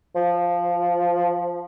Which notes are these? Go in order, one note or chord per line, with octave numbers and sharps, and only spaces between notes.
F3